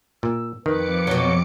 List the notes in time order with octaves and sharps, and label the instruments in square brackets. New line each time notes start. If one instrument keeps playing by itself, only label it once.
[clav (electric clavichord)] A#2 [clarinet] E6
[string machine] F2 D6 C#7 [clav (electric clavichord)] D#3 [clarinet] B4
[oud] B2 F#3